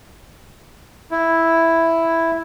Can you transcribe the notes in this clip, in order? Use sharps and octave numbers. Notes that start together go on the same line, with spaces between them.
E4